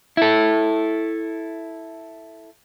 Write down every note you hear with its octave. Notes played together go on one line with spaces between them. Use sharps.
E4 A4